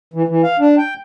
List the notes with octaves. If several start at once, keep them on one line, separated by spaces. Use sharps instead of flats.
E3
E3
F5
D4
G5